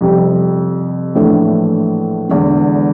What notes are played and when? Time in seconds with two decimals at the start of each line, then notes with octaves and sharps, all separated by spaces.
0.01 F2 C3 G3
1.15 A#1 A2 E3 A3 D4
2.29 E1 E2 D3